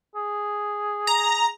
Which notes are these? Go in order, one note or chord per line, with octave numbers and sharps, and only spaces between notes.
G#4
A#5